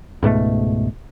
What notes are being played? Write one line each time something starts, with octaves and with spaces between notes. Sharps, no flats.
C#2 G#2 B2 A3